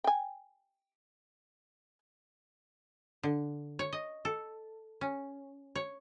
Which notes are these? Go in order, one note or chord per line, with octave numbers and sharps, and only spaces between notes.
G5 G#5
D3
C#5
D#5
A4
C#4
C#5